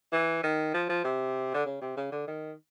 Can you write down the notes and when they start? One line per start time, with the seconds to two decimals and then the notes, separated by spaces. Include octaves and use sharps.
0.12 E3
0.43 D#3
0.74 F3
0.89 F3
1.04 C3
1.54 D3
1.65 C#3
1.81 C3
1.97 C#3
2.12 D3
2.27 D#3